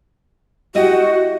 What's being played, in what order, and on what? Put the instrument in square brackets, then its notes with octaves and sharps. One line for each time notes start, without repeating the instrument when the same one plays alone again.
[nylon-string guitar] E4 G4 D#5 [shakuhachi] F#4